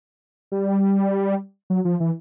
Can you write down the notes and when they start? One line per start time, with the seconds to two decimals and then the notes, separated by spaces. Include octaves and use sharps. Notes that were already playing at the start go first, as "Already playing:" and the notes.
0.52 G3
1.70 F#3
1.85 F3
2.00 E3